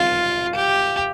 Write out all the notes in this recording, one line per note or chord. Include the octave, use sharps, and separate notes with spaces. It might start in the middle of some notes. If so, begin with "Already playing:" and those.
Already playing: F4 F5
G4